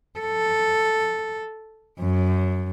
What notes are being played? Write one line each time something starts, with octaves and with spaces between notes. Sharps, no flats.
A4
F#2